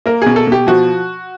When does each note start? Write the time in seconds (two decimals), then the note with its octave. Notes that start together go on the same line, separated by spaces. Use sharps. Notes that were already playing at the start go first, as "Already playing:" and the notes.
0.06 A#3 A#4
0.22 B2 G#4
0.36 A4
0.47 B2 G4
0.67 F3 F#4